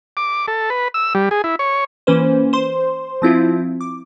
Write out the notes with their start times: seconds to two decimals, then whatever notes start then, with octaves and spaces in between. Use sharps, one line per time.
0.17 D6
0.48 A4
0.70 B4
0.94 E6
1.15 G3
1.31 G#4
1.44 E4
1.59 C#5
2.07 E3 A#3 C#4 B4 C5
2.53 C5 C6
3.22 F3 C4 E4 F4
3.81 D6